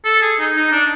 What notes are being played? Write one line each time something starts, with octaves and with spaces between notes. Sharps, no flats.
A4
G#4
D#4
D#4
D4